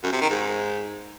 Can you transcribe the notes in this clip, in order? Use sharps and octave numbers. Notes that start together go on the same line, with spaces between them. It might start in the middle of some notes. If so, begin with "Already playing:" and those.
F#2
C3
D#3
G#2